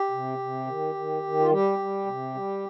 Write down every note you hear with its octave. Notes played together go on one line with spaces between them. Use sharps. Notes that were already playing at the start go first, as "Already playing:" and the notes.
Already playing: G4
C3
C3
D#3
D#3
D#3
F4
G3 G4
G3
C3
G3